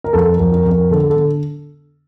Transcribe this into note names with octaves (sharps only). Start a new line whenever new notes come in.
A#4
F2 A4
A#4
F2
A#4
F2
A#4
D3 A4
A4
D3